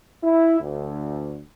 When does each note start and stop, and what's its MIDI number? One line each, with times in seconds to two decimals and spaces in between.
0.23 0.58 64
0.60 1.38 38